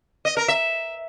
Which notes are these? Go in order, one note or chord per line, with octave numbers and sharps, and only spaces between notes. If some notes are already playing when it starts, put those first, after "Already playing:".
D#5
A#4
E5